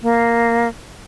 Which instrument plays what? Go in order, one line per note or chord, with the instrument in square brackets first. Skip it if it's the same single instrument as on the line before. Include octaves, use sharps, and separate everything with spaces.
[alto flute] A#3